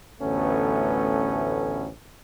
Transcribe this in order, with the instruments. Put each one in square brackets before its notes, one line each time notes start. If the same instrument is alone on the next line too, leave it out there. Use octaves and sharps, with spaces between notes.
[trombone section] A1 D2 A3 B3 C#4